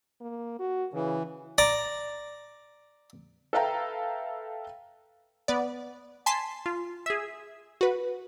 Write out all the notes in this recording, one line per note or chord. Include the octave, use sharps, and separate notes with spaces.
A#3
F#4
C#3 E3
D5 A#5
A4 B4 E5 F5 G5 A#5
B3 D5
G#5 A5 C6 B6 C7
F4
G#4 E5
F#4 B4